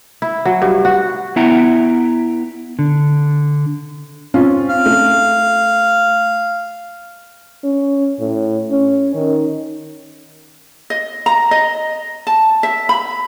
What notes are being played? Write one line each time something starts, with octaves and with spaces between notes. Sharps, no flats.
E4
F#3
G2
F#4
B3 E4 E5 F#5 G5 A#5
D3
C4 C#4 F4
F5
A3
C#4
A2
C#4
D#3
D#5
A#5
D#5
A5
E5
B5